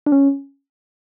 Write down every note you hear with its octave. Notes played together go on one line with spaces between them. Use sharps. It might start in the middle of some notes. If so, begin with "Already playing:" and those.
D4
C#4